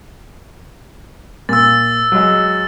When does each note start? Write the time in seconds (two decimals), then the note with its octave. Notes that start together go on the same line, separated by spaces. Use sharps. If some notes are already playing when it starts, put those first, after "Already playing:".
1.49 A#2 E6 A6
2.12 F#3 G#3